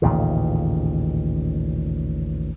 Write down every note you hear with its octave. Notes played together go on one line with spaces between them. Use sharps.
A1 D#2 A#2 C#3